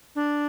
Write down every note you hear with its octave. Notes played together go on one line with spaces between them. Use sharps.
D4